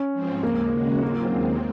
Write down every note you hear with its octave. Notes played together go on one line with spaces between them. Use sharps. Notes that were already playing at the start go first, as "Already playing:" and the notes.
Already playing: C#4
G#2 F3 C4
D#2 C#3 G#3 A#3
C#3 G#3 C#4 F#4
G#2 F#3 A#3 C4 F4
D#2 D#3 G#3 C4